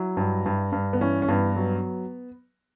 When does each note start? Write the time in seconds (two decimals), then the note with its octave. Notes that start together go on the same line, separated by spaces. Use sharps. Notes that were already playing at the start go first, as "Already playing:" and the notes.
Already playing: F#3 E4
0.17 G2
0.46 G2
0.72 G2
0.93 B3
1.00 E3 C#4
1.22 C#4
1.28 G2 B3
1.56 F#3